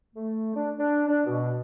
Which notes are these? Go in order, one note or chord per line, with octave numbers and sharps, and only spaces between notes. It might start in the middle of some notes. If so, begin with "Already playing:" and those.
A3
D4
D4
D4
B2